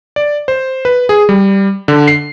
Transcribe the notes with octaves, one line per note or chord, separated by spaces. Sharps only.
D5
C5
B4
G#4
G3
D3
C7